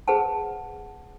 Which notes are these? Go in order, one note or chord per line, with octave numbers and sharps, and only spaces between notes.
G#4 B4 C5 F#5 A5